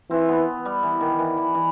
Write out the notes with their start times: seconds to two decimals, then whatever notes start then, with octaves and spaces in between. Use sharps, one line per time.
0.11 E3 C4
0.29 B3
0.65 G3
0.83 E3
1.01 D#3
1.19 E3
1.38 E3
1.55 E3